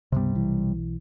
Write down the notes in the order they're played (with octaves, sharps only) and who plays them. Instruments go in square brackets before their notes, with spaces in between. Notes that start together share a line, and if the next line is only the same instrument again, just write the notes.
[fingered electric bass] C#2 G2 B3 [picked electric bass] C3 G3
[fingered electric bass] B1 E3